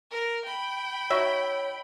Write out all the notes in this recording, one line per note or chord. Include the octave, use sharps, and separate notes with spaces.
A#4
G5 B5
D#4 F#4 C#5 E5